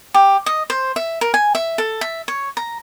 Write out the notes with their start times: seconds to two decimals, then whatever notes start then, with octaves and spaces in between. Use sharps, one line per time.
0.14 G4
0.46 D#5
0.70 C5
0.96 E5
1.21 A#4
1.34 G#5
1.55 E5
1.78 A4
2.01 E5
2.28 C#5
2.57 A#5